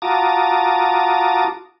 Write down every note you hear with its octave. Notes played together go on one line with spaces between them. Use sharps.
F4 F#4 A5 A#5 D6 D#6